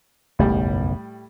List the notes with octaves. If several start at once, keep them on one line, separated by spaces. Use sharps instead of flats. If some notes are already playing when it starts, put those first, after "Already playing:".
F#1 B1 E2 A2 G3